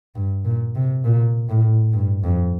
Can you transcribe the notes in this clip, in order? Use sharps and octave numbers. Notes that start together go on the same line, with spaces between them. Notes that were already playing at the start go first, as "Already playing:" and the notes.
G2
A#2
C3
A#2
A2
G2
F2